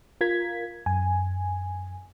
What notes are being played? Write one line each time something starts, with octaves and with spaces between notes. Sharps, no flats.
F4 A#4 G#6 B6
F#2 G#5